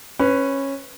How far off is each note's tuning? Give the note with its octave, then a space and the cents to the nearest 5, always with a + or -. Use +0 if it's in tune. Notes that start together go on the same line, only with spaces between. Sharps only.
C#4 -15 B4 +5